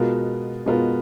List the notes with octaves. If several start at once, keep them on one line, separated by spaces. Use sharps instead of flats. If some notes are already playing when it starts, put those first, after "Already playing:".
Already playing: B2 G#3 B3 F4 A#4
B2 G#3 B3 F4 A#4